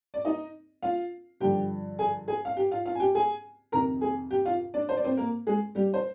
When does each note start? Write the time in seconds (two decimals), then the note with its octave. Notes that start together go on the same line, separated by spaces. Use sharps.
0.14 D5
0.25 D#4 D#5
0.82 F4 F5
1.40 G2 D3 F3 G4 G5
1.99 G#4 G#5
2.28 G#4 G#5
2.45 F5
2.57 G4 G5
2.71 F4 F5
2.85 F4 F5
2.95 G#5
3.00 G4 G5
3.15 G#4 G#5
3.72 F2 C3 D#3 A#4 A#5
4.01 G#4 G#5
4.31 G4 G5
4.45 F4 F5
4.74 D4 D5
4.89 C5
4.97 D5
5.04 C4 C5
5.17 A#3 A#4
5.47 G#3 G#4
5.75 G3 G4
5.94 C5